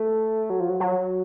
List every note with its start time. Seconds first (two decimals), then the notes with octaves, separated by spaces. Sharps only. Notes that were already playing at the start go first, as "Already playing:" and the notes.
Already playing: A3
0.50 F#3
0.60 F3
0.70 F#3
0.80 F#3